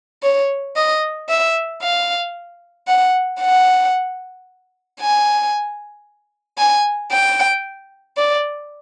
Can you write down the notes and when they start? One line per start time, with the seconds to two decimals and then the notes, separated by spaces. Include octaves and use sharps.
0.23 C#5
0.76 D#5
1.29 E5
1.82 F5
2.87 F#5
3.41 F#5
5.00 G#5
6.58 G#5
7.12 G5
8.17 D5